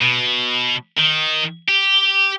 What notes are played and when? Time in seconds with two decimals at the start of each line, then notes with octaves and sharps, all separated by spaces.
0.01 B2
0.99 D#3
1.68 G4